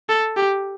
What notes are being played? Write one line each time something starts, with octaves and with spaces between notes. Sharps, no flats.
A4
G4